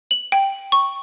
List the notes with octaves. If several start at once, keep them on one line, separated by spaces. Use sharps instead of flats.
F#7
G5
C#6